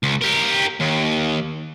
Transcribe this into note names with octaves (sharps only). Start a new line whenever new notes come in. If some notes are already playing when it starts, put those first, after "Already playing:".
C#2
G4 A#4
D#2